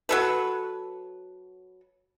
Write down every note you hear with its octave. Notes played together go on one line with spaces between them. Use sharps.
F#3 A4 B4